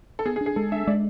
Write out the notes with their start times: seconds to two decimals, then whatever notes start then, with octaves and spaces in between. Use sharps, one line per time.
0.19 A4
0.25 B3 G#4
0.36 G#4
0.41 D4
0.46 G#4
0.56 G#3 A4
0.72 D4 E5
0.87 G#3 D5